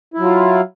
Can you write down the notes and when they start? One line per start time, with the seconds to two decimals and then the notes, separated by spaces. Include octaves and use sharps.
0.14 E4
0.19 F#3
0.24 F4